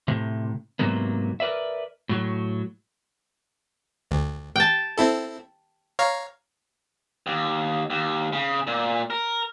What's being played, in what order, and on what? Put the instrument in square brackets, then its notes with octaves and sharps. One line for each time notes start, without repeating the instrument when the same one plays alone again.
[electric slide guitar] A2 C3
G#2 C3 F#3 A#3 B3
A#4 B4 D5 E5
A2 F#3
[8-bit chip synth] D2
[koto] G5 A5
[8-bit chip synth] C4 E4 A4
C#5 F5 A#5
[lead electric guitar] D#2
D#2
C#3
A#2
A#4